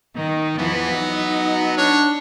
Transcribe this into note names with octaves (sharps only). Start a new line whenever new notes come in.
D#3 D#4
E2 E3 F3 B3
F#3 D#4
D4 C#5